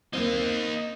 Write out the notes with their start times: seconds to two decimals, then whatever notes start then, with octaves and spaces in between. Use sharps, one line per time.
0.13 A#3 C4 D#4 F5